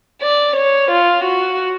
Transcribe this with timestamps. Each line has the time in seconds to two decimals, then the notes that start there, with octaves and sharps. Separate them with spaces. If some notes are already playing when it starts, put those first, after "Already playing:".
0.22 D5
0.56 C#5
0.91 F4
1.24 F#4